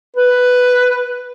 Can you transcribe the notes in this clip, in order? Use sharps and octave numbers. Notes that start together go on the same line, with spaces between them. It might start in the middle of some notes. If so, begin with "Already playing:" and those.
B4